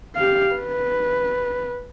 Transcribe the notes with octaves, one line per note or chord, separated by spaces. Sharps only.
G4 F5
B4